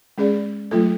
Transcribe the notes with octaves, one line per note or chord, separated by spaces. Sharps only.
G#3 C#4 G#4 D5
F#3 A3 F4 A4